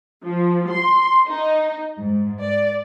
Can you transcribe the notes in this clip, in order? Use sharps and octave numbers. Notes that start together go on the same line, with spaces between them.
F3
C6
D#4
G#2
D5